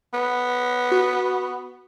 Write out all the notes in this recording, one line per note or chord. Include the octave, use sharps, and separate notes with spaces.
B3
F#4